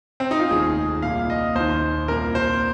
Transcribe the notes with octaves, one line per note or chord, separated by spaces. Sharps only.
C4
D#4
F4
F1 D#2 D#3 G#4
C2 A#2 F5
D#5
D#2 D#3 C5
C2 A#2 A#4
C5